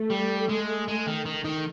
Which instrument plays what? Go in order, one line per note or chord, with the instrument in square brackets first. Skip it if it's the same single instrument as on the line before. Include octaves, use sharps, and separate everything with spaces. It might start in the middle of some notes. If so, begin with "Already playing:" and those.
Already playing: [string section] A3
[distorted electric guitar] G3
G#3
G#3
D#3
D#3
D#3